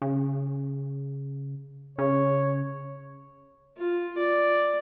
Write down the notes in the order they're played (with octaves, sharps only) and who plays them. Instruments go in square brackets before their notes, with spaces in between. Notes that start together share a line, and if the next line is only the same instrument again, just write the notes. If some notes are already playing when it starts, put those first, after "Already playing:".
[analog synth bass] C#3
[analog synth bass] C#3 [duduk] C#5
[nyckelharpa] F4
D5